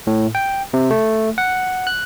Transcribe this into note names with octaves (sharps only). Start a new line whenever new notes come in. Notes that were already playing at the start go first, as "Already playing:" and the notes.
A2
G5
C3
A3
F#5
F#6